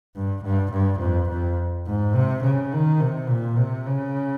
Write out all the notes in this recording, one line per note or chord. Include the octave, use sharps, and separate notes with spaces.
G2
G2
G2
F2
F2
G#2
C3
C#3
D#3
C3
A#2
C3
C#3